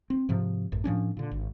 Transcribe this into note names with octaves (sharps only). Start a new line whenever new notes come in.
C4
G#2 C3 F3
A1 F#2
A2 F3 C#4 D4
A#2 D3
G#1